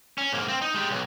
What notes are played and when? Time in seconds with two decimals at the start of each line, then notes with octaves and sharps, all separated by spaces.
0.18 C#4
0.32 G#2 A#3
0.48 C4
0.62 D#4
0.74 G#3 G4
0.90 B1